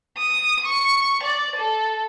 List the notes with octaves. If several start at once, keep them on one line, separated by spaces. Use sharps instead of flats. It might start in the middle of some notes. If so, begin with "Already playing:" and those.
D#6
C#6
D5
A4